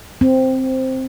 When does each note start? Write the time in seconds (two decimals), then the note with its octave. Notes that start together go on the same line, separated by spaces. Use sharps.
0.21 C4